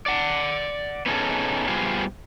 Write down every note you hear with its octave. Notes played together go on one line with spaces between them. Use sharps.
D5 F#5
B3 C#4 D#4 G#4 A4
G3 B3 F4 G#4 C5